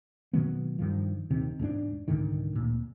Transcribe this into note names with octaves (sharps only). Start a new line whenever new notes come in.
B2 D#3 F#3 B3
G2 D#3 F3
D#1 C3 D#3
E1 G#2 C3 D4
C2 G#2 D3 D#3
D1 A#2